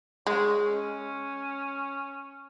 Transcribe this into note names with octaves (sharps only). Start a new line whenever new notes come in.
G#3 C#5
C#4